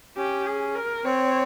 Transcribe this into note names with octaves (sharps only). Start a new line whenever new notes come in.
C#4 G4
G#4
A#4
C4 C#5